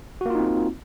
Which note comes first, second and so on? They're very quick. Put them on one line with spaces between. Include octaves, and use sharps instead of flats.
F#4 A#3 F4 D#4 C4